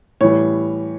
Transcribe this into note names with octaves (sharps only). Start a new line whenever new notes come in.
A2 E3 G3 C#5